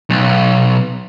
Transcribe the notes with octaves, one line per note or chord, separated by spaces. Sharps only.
B1